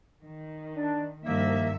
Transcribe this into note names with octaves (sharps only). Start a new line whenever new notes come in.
D#3
D4
C2 G2 D#3 F3 A#3 E5